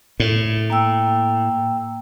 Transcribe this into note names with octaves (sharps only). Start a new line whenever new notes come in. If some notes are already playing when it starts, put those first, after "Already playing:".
A2
A#3 G5 E6